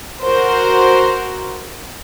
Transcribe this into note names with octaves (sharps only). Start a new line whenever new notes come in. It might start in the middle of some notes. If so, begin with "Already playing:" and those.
F#4 A#4 C5